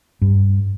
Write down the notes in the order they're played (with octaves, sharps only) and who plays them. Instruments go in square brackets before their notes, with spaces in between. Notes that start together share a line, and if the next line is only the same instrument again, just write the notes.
[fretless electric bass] G2